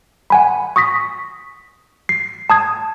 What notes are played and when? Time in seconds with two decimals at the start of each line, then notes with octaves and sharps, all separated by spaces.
0.30 F#5 G#5 B5
0.76 C#6 D#6 A#6 B6
2.09 C7
2.50 A5 D#6 G#6